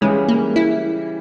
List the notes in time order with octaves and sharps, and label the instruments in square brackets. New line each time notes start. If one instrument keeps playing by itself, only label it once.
[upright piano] C#3 E3 G3 C#4 [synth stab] G#3
[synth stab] A#3
E4